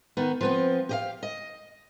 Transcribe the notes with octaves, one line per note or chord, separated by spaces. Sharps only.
D#3 B3
F3 B3 C4
G4 D#5 F5
D#5